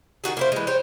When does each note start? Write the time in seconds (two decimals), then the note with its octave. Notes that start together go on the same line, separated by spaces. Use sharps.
0.24 D#3 D#4 F#4 G#4
0.37 A#3 E4 C5
0.52 E3 G#3
0.67 C5 C#5 G5